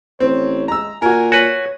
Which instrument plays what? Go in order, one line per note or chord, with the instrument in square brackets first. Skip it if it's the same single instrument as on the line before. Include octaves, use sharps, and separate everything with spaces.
[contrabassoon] A1 [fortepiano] C4 [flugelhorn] C#5
[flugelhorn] G#3 [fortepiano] A#5 E6
[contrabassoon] A#2 [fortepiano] F#4 A#4 [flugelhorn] G#5
[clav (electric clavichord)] F#4 B4 [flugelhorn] C#5 [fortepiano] G#5